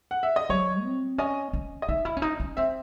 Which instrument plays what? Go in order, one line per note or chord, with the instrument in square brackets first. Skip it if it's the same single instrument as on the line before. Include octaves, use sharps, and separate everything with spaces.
[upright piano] F#5
E5
D#5
[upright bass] F#3 [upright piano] C#5
[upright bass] C4
[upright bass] C#4 [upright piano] D#5
[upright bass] C#4
[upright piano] D#5
[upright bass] D#4 [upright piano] E5
[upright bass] E4
C#4
D#4
C#4
[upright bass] C4 [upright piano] E5